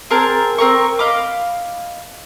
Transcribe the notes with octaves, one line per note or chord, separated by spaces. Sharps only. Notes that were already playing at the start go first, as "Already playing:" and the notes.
C4 G#4 A#4 A5
C4 A#4 C#6
D#5 F5 B5 D6